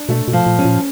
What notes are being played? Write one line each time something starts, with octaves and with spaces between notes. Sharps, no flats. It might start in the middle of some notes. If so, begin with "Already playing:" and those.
Already playing: D4
B2 A3
B2
F3
A#2
C#4
A#2